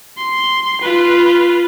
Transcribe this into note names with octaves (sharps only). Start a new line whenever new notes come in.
C6
F4 B4